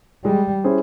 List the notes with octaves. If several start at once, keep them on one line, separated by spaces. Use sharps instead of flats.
G3 G#3
C#4 E4 G#4 C5